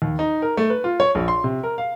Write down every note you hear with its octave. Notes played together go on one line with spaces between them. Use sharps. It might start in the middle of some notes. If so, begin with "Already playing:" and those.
D#2
D#4
A#4
A3
B4
F4
C#5
A#1
C6
C3
A#4
F5